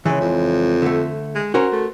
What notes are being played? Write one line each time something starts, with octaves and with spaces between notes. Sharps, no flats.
C#2 C#3 E3
F2
D3 A3
G#3
C#4 F#4 A#4 C5
A3